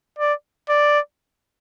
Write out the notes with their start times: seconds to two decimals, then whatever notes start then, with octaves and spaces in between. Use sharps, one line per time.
0.18 D5
0.69 D5